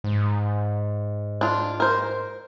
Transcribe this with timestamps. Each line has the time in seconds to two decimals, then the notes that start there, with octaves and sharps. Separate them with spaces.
0.04 G#2
1.41 D4 F4
1.80 A#4 C5